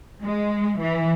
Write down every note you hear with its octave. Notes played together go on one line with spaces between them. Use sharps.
G#3
E3